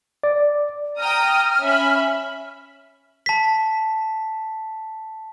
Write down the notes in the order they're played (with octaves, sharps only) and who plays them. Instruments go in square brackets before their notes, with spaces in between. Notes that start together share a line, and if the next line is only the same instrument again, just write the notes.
[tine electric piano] D5
[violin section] G5 A#5 D#6 [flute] F6
[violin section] C#4 E5 B5
[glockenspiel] A5 B6